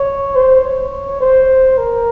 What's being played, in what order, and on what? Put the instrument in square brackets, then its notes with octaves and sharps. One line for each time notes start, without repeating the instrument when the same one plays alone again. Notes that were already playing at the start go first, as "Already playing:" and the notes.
Already playing: [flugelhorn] C#5
C5
C#5
C5
A#4